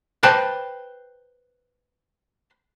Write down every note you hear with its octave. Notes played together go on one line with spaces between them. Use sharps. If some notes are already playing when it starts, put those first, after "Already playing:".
B4 C5 G5 A5